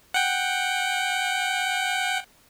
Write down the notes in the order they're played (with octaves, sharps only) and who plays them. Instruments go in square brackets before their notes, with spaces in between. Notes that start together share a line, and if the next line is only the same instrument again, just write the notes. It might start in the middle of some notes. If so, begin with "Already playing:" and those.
[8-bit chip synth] F#5 G5